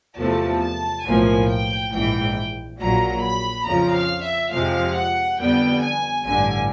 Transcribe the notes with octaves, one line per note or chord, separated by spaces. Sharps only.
E2 C3 F3 A3 A5
A5
B1 A2 F3 A#3 G#5
G5
A#1 G#2 E3 G5
A#1 A#2 F#3 A#5
B5
F2 C#3 F3 A#5
F5
E5
F2 C3 F3 G#3 F5
F#5
F2 D3 G3 B3 G5
G#5
A1 G2 D3 G#5